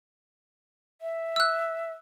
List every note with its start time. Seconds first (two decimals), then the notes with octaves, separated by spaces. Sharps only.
1.01 E5
1.36 E6 F#6